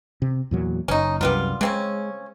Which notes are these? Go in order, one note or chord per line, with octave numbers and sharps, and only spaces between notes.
C3
E2 A#2 F#3
F#1 C#4 D#4
C2 F#2 G3 B3 F4
C#3 G#3 C4 C#4